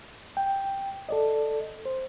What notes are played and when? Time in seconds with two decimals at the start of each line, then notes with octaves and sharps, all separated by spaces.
0.37 G5
1.09 A4 D5 D#5
1.86 C5